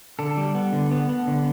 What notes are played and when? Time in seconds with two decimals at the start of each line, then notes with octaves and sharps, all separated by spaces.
0.19 D3 A4
0.37 G3
0.55 B3
0.73 D3
0.91 B3
1.09 B3
1.27 D3